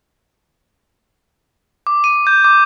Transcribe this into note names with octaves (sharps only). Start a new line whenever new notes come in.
D6
D#7
G6
D6